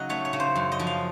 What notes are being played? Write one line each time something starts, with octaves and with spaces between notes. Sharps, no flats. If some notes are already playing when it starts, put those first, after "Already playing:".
Already playing: C#3 F#3 D#4 D#5 F#5
A3 C#5
C#5
C#3
C5
F#2
D#5
F3
F5